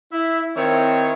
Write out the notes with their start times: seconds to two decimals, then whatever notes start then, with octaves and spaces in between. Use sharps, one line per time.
0.12 E4 E5
0.56 D#3 C4 E4 C#5